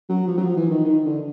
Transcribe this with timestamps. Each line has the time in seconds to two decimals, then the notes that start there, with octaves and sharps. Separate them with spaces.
0.09 F#3
0.27 F3
0.37 F#3
0.42 F3
0.56 E3
0.71 D#3
0.85 D#3
1.05 D3